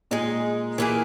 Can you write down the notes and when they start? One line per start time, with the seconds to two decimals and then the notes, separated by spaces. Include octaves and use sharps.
0.11 A#2 G#3 D#4 G#4
0.78 A#2 E3 A#3 E4 G#4